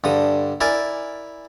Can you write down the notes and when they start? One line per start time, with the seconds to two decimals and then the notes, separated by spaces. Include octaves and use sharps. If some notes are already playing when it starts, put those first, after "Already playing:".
0.04 G2 D3 D#6
0.61 E4 A#4 D5 G#5